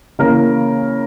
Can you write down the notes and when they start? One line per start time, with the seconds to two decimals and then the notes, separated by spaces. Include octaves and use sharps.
0.19 C#3 E3 A#3 A#4